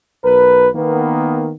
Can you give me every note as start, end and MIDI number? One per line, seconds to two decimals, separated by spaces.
0.22 0.67 35
0.22 0.67 70
0.22 0.67 71
0.74 1.51 51
0.74 1.51 58
0.74 1.51 59